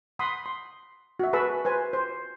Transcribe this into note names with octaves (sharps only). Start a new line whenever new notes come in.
F#5 B5 C6 D#6
C6
F#4 E5
G#4 B4 A5 B5 C#6 E6
B4 C5 G#5
C5